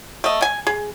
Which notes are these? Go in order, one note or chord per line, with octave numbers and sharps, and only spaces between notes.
A3 D#5
G#5
G#4